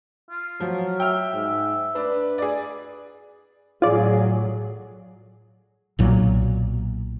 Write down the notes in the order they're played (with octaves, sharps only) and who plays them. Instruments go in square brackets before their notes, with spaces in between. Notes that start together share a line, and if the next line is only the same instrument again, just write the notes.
[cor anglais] F4
[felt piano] F3 [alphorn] F#3
[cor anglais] E5 [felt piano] G5 F6
[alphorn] G#2
[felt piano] D4 [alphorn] B4
[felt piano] G#4 D5
[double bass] A2 F#3 [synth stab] F4 D5 [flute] G#4
[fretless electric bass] B1 A#2 F#3